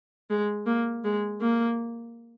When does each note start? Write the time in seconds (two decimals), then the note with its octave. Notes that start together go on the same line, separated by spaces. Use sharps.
0.30 G#3
0.66 A#3
1.04 G#3
1.41 A#3